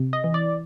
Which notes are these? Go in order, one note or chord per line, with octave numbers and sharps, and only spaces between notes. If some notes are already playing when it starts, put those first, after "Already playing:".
Already playing: C3
D#5
E3
D5